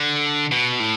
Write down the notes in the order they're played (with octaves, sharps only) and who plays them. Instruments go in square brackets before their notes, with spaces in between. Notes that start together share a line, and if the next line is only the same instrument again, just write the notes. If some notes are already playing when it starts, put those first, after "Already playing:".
Already playing: [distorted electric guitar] D3
B2
A2